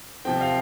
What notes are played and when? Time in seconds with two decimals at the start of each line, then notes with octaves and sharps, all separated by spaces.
0.25 C3 F3 C4 G5
0.41 F5